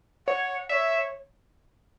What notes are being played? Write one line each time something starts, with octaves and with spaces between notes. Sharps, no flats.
C#5 F#5
C#5 D5 E5